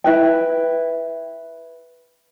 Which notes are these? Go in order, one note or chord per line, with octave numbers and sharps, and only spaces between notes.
E4 B4 G5